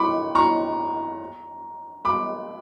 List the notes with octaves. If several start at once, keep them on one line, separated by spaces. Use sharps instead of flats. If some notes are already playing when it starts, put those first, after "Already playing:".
Already playing: B5 C#6 D6
A#5 C#6
B5 D6